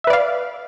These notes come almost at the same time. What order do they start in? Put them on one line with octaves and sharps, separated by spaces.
E5 B4 D5 F5